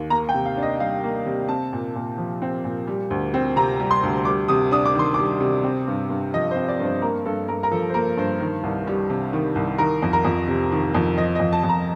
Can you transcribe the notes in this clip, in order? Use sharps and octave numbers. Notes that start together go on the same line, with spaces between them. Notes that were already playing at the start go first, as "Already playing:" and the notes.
Already playing: D#2
A#3 A#5
G5
C3
F5
D4
D#5
G3 F5
A#3
C3
C4 A5
A#2
A#2
F3
C4
A#2
G3
D2
C4
C3 A#5
G3
C6
D2
G3 D6
C3 D#6
D4 D#6
D6
D#3 C6
G3 D6
C3
C4
G2
G2
F3 D#5
C5
C4
D5
G2 C5
A#3 A#4
G2 A4
G2 A#4
A#4
F3 A4
C5
A#3 A#4
G2 C5
D#3
C2
G3
C3
D#3
C2
D#3 A#4
F2
A#4
F2
C3
D#3
F2
F3 D#5
D#5
F2
A5
F2
A#5